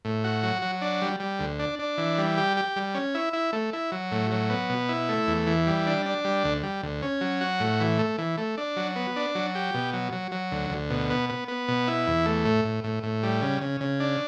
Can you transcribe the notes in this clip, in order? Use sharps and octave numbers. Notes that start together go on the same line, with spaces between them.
A2
F#4
F#3
F#3
D4
G3
G3
D2
D4
D4
E3
G3
G4
G4
G3
C#4
E4
E4
A3
E4
F#3
A2
F#3
B3
B2
E4
A3
E2
E3
G3
D4
D4
G3
D2
G3
D2
C#4
F#3
F#4
A2
E3
A3
E3
A3
D4
F#3
B3
D4
F#3
G4
B2
F#3
F#3
F#3
D2
D2
B2
B3
B3
B3
B2
E4
E2
A3
A2
A2
A2
A2
G3
C#3
C#3
C#3
D4